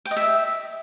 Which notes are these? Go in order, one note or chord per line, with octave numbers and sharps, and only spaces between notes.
G5
D#5
E5